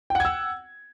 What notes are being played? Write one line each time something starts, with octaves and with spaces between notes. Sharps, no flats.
F#5 G5 E6 G#6